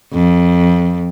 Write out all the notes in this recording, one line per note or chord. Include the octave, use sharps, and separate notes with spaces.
F2